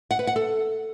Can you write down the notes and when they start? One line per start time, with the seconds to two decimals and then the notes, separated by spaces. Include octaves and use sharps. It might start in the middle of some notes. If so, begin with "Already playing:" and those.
0.11 F#5
0.19 B4
0.27 F#5
0.36 A4